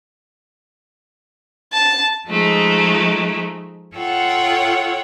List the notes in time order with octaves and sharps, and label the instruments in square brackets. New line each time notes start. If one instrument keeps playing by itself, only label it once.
[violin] A5
[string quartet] F3 G#3 A3 D#4
F4 A4 C#5 F#5 G5